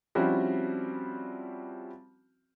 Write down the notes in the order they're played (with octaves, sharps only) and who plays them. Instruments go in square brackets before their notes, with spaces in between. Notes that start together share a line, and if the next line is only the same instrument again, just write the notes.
[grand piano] F3 G3 C4 C#4 E4 F#4